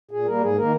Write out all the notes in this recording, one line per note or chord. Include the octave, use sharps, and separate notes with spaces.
A#2 G#4
G3 A#3 A#4
G#2 G#4
D#3 A#3 A#4